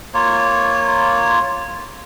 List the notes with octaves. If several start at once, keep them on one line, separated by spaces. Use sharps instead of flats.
A#3 F4 C#5